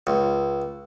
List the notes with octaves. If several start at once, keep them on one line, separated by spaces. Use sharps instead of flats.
C#2